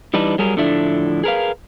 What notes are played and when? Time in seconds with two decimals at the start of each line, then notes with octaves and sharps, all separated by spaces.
0.14 E3 G3 D4 D#4 B4
0.38 F#3 G3 G#4 A#4
0.56 A2 D3 F3 A3 D4 E4
1.24 G#4 A#4 B4 F5